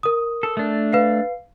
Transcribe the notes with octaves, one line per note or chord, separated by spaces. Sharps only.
A#4 D#6
A4
A3 D4
B4 F5 C7